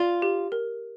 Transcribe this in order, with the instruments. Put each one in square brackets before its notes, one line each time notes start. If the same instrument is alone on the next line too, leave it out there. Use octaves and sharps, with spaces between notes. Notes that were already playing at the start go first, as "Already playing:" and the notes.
Already playing: [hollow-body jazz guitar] F4 [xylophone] D5
[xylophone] G4
A#4